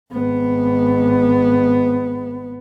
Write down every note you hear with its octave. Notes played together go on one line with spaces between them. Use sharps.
G#1 B3